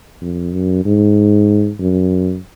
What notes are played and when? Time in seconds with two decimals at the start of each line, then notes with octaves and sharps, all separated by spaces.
0.21 F2
0.53 F#2
0.85 G#2
1.80 F#2